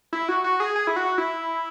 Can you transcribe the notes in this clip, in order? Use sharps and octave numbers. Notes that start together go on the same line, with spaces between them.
E4
F#4
F#4
G#4
G#4
E4
F#4
E4